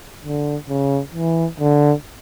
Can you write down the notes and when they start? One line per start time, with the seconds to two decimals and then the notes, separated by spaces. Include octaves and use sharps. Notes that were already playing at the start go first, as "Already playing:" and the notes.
0.24 D3
0.69 C#3
1.14 E3
1.60 D3